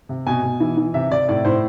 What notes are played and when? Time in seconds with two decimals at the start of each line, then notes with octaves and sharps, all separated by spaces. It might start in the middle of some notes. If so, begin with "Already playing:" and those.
0.09 C3
0.27 B2 G#5
0.43 B2
0.60 E3
0.77 E3
0.94 C3 E5
1.11 C3 D5
1.29 A2 D5
1.45 A2 C5